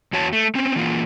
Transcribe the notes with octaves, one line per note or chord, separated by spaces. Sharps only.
E2 F#4 C#5 A5
A3
C4 C#4
E3 A#3 F4